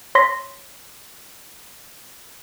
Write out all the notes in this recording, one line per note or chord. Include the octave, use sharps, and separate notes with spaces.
C#5 C6 A#6 B6